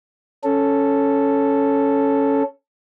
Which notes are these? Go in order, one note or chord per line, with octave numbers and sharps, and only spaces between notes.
C#4 A4